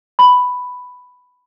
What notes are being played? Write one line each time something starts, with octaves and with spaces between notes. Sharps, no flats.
B5